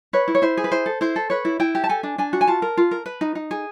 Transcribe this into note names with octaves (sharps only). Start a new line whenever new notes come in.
B4 C#5
E4
C#5
E4 C5
G#4
B4
E4 C5
A4
E4 C5
A4
B4 C#5
E4
E4 G5
G4
A5
A4 G#5
D4
D4 G#5
F#4
G#5
F4 A5
A#4
F4
A#4
B4
D#4
D#4
G#4